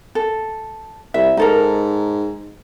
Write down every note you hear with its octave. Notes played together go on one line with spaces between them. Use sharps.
A4
C2 E5
G#2 D#4 A4 A#4